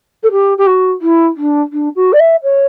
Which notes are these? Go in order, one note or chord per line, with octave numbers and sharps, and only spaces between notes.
A4
G4
G4
F#4
E4
D4
D4
F#4
D5
E5
C#5